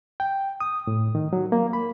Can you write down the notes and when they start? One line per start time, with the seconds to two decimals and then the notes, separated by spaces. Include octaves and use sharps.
0.20 G5
0.61 D#6
0.87 A2
1.15 D#3
1.33 F#3
1.52 A#3
1.73 B5